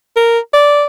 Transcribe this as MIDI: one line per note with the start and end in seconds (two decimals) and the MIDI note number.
0.16 0.39 70
0.53 0.87 74